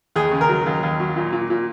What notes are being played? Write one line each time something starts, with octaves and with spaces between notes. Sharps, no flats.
D#2 G#4
C#3
A#4
F#3
D#2
D#2
F#3
A#2
A#2
A#2